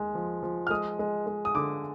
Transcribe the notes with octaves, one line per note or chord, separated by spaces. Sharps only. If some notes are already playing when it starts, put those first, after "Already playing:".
Already playing: D#2 G#3
F3
F3
F6
G#3 D#6
G#3
G#3
D#6
D3 D6